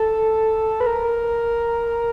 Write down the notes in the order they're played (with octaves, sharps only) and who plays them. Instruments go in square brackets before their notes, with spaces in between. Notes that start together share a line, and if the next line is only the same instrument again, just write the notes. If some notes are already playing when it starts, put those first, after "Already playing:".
Already playing: [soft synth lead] A4
B4
A#4